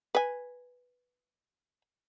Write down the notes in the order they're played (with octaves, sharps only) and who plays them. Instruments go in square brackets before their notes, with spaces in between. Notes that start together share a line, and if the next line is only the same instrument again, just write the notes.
[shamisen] B4 G#5